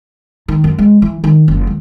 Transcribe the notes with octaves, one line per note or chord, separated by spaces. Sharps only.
D#3
F#2
G#3
E3
D#3
F#1
D#2